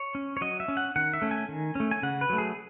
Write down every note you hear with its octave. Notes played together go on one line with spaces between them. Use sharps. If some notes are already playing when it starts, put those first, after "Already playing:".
Already playing: C#5
C#4
C#5
F#3 D#5
E5
C#4
F#5
D#3 F#5
E5
A3 C#4
G#5
D#3
A3 C#4
G#5
C#3 F#5
B4
F#3 A3
G#4